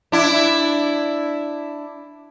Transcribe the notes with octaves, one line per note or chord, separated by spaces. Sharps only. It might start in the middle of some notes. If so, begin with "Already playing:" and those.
D4 E4